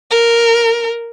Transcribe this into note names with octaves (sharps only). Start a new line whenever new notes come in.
A#4